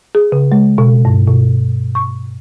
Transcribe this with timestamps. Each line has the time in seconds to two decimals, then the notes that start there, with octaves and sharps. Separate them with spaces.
0.15 G#4
0.32 C#3
0.52 G#3
0.78 B2
1.05 G2
1.28 B2
1.95 C#6